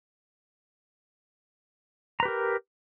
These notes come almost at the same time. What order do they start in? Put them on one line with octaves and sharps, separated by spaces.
A#5 B4 G4 A#4